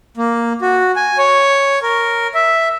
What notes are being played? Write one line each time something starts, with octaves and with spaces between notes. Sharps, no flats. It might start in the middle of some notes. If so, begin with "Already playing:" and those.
A#3
F#4
G#5
C#5
A#4
E5